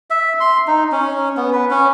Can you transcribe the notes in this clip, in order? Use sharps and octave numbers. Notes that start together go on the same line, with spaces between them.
E5
C6
D#4
C#4
B3
B4
C#4